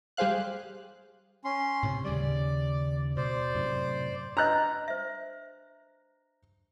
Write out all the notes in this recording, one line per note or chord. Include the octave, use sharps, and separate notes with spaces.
G3 G4 G#4 C5 F5 F#6
C#4 C6
A2 C3
D#2 C#3 G3 D5
B2 C5 D5
F#2 A2 C3
D4 B4 D#5 A#5 F#6
C5 E5